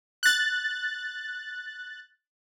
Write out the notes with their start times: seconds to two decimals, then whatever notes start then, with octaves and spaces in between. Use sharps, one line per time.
0.23 F#6 A6